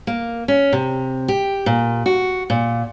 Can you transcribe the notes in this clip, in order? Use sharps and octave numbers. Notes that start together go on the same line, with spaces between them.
A#3
C#4
C3
G4
A#2
F#4
A#2